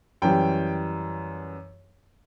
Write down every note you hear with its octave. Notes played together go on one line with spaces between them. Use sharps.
F#2 E3 G3 G5